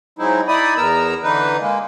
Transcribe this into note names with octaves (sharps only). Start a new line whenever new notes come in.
F#3 G#3 C4 D#4 E4
D#4 E4 D5 B5 D#6
E2 B3 A#4 A#5 E6
D3 E3 D#4 B4
G#3 A#3